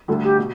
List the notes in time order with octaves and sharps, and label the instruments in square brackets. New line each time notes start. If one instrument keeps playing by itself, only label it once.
[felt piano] D2 D3 G3 [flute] A4
[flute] G4
[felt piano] B2